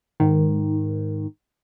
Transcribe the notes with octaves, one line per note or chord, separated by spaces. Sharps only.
G#2 D#3